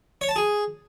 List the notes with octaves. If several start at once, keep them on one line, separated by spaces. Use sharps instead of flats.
C#5
A5
G#4